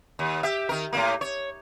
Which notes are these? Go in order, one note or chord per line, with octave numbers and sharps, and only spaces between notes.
D#2
G4 E5
D#3 A#4
A2 D3 A#3
C#5